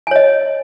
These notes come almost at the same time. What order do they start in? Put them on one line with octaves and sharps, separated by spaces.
G#5 C#5 D#5